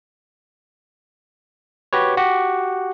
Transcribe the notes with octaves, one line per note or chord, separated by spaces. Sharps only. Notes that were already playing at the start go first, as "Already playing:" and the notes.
F#4 G4 B4 C#5
F#4 G4 F#5